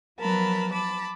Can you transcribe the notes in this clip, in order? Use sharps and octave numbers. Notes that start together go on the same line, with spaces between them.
F3 F#3 B3 A#4 A5 B5
A5 B5 D6